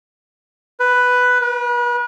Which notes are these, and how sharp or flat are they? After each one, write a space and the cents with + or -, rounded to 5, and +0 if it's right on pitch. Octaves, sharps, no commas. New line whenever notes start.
B4 +5
B4 -40